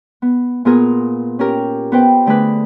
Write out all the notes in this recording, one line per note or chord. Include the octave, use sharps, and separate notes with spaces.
B3
A#2 B3 F4 G#4 A#4
C#4 G4 A#4
B3 B4 C5 G5
D3 A3 D4 G#4 B4